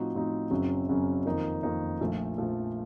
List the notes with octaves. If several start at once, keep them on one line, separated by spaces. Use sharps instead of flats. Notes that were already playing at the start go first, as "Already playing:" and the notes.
Already playing: A2 F3 C4 D#4 F#4
A2 F3 C4 D#4 F#4
F#1 F#2 C#3 F#3 C4
F#1 F#2 C#3 F#3 C4
F2 D#3 A#3 D#4
F2 D#3 A#3 D#4
A#1 A#2 F3 A3
A#1 A#2 F3 A3